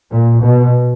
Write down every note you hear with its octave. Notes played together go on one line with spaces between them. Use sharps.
A#2
B2